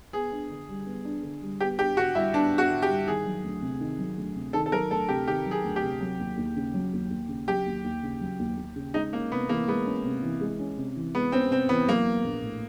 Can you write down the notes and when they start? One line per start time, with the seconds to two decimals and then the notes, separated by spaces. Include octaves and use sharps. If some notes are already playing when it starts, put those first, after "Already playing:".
0.13 B3 G#4
0.32 D4
0.51 D3
0.69 G3
0.86 B3
1.05 D4
1.23 D3
1.42 G3
1.60 B3 G4
1.79 D4 G4
1.97 D3 F#4
2.15 G3 E4
2.34 B3 D4
2.52 D4
2.58 F#4
2.70 D3
2.82 G4
2.89 G3
3.07 D#3 G#4
3.26 F#3
3.44 D2
3.62 C3
3.81 D#3
3.99 F#3
4.18 D2
4.36 C3
4.53 D#3 A4
4.66 A4
4.72 F#3 A#4
4.91 D2 A4
5.08 C3 G4
5.27 D#3 G4
5.46 F#3
5.51 G#4
5.64 D2
5.76 G4
5.83 C3
6.01 F#3
6.19 D#2
6.37 D#2
6.56 C#3
6.74 F#3
6.93 D#2
7.11 D#2
7.29 C#3
7.48 F#3 G4
7.66 D#2
7.84 D#2
8.03 C#3
8.21 F#3
8.39 D#2
8.57 D#2
8.76 C#3
8.94 G#3 D#4
9.13 A#3 C#4
9.32 C3 B3
9.49 E3 A#3
9.68 G#3 B3
9.86 C#4
10.05 C3
10.23 E3
10.41 G#3
10.59 C#4
10.77 C3
10.96 E3
11.15 G#3 B3
11.32 C4 C#4
11.51 C3 C4
11.69 E3 B3
11.87 F#3 A#3
12.07 B3
12.24 A#1
12.43 A2